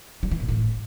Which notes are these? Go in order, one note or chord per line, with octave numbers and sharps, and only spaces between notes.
G3
E3
A#2
A2